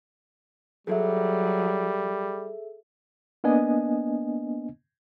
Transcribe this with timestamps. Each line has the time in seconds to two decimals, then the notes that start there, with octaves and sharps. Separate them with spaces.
0.87 F#3 G3 G#4 A4 E5
3.44 A#3 B3 D4 D#5 G#5